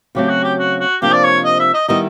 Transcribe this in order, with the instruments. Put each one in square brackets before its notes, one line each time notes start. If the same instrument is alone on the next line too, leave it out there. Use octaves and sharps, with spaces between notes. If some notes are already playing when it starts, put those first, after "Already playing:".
[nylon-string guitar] C#3 F#3 A3 C4 [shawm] G4
[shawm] F#4
G4
F#4
F#4
[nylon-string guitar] C3 F3 A#3 D4 [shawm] G4
[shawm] D5
C#5
D#5
E5
D#5
[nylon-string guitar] D#3 G3 B3 E4 [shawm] D#5